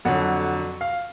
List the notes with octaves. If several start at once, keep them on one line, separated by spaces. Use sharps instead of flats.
F2 D3 F#3 F#5
F5